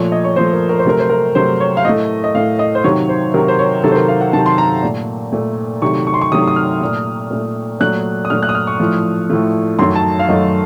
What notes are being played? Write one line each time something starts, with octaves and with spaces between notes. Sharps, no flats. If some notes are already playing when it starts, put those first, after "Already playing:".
Already playing: A#2 F3 A3 C#5
D#5
C#5
A#2 F3 A3 C5
A#4
A#4
C5
C3 F#3 A3 A#4
C5
A#4
C3 F#3 A3 C5
C#5
F5
A2 A3 D#5
D#5
A2 A3 F5
D#5
C5
C3 D#3 F#3 C#5
C5
C3 D#3 F#3 A#4
C5
C#5
C3 D#3 F#3 A4
C5
A#4
F5
F#5
C3 D#3 F#3 A5
C6
A#5
A#2 A3
A#2 A3
C3 D#3 F#3 A3 C#6
C#6
C6
C#6
C3 D#3 F#3 A3 D#6
D#6
F6
A#2 A3
A#2 A3
A#2 F#3 A3 F#6
D#6
A#2 F#3 A3 F6
F#6
D#6
F6
C#6
A2 F3 A3
A2 F3 A3
F#2 D#3 F#3 A3 C6
A5
F5
F#2 D#3 F#3 A3 D#5